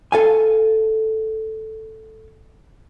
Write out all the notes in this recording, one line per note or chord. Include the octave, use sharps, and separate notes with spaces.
A4 F5 G#5